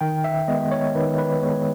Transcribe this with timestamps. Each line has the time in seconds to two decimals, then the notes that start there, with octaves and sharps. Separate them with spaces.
0.01 D#3 G5
0.24 E5
0.48 G#3 B3 D#5
0.71 C#5
0.95 D#3 B4
1.18 B4
1.42 G#3 B3 C#5